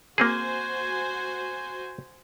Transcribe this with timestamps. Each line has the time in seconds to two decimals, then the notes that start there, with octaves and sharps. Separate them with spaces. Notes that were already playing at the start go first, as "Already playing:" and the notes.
0.18 A#3 C4 F#4 G#4 C5 G#5